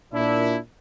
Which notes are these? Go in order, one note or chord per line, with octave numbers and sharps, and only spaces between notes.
A#2 D4 E4